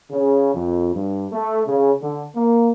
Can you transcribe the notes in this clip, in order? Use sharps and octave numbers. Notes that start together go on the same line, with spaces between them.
C#3
F2
G2
A3
C#3
D3
A#3